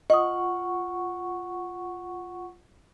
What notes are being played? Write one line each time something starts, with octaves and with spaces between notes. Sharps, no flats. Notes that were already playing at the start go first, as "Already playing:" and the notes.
F4 D#5 F#5 C#6 D#6